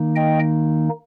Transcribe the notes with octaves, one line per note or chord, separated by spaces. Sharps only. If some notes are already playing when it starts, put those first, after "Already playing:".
Already playing: D#3 A#3 D#4
D#5 G5